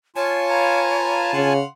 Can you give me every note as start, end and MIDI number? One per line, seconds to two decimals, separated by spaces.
0.16 1.53 65
0.16 1.33 73
0.16 1.53 80
0.16 1.53 81
0.49 1.29 71
0.49 1.29 77
0.49 1.29 82
1.33 1.61 49
1.33 1.65 77
1.33 1.65 78
1.33 1.65 84